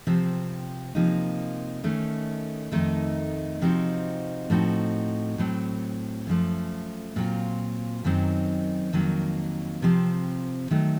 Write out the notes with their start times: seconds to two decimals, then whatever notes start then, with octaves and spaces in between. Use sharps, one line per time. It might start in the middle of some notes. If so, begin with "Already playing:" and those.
0.07 C3 F3 C4
0.95 C3 F3 A#3 D#4
1.84 D#3 A3 C#4
2.72 F2 D#3 A3 D#4
3.61 C3 F3 C4 D#4 F#4
4.50 A2 F3 C4 D#4 F#4
5.38 A2 F#3 C4
6.27 F#2 F3 A3
7.16 A#2 F#3 C4 F4
8.04 F#2 D#3 F#3 C4 D#4
8.93 F2 D#3 F#3 A#3
9.82 C3 F3 C4
10.71 D#3 F#3 A3